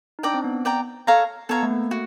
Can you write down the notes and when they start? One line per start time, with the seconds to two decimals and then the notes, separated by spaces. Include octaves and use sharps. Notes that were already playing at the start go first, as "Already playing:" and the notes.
0.19 D#4
0.23 D4 D5 G5 A#5
0.34 C4
0.44 B3
0.65 D5 G5 A#5
1.07 A4 C#5 F5 A#5
1.49 B3 A4 C#5 F5 A#5
1.63 A3
1.71 A#3
1.91 F#4